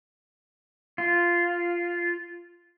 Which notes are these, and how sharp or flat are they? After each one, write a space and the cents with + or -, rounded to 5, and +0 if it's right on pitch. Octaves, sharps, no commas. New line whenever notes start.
F4 -10